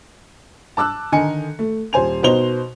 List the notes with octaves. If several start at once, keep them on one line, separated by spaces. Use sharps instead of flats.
A5 D6 E6 F#6
D3 D#3 D#4 G#5 C#7
A3
D#1 C5 G#5 F7
B2 B3 D#4 C5 F7 G7